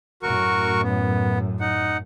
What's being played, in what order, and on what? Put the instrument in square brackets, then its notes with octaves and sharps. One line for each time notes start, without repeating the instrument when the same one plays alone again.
[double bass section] F#2 A2 [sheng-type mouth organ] F#4 A#4 C#6
[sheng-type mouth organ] B3
D#4 F#5